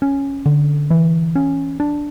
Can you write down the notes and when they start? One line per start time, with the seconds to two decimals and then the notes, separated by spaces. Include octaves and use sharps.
0.02 C#4
0.46 D3
0.90 E3
1.35 C#4
1.80 D4